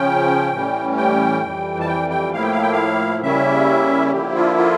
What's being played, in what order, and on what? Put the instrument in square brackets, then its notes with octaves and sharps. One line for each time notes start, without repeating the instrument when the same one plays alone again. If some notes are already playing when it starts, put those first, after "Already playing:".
Already playing: [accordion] C#3 F3 C#4 G5
A2 E3 G3 C#4
G5
F2 E3 G3
A5
G5
G5
A2 F3 A#3 E4 F5
G5
F5
G5
F5
C#3 G3 A#3 C#4 E4 E5
D3 F3 A#3 E4 G4
F4
F4